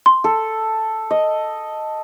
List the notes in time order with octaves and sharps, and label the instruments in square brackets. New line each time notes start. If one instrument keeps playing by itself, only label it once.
[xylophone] C6
[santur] A4
D#5